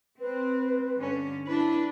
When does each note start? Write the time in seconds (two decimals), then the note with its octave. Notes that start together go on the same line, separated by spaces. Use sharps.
0.20 C4 B4
0.97 G2 D3 C#4
1.48 D4 E4 B4